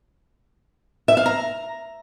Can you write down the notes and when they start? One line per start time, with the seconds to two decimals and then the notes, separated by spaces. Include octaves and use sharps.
1.08 E5
1.17 F5
1.26 A#5